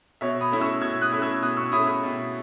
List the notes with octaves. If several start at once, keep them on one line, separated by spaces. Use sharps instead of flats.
B2 C#5 E5
B5 D#6
A3 C#4 E4
C#6 E6
B2 E6 G#6
D#6 F#6
A3 C#4 E4
E6 G#6
B2 D#6 F#6
C#6 E6
A3 C#4 E4 B5 D#6
B5 D#6
B2